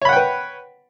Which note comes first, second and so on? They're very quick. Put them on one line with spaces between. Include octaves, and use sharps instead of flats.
C#5 B5 F#5 G5 B4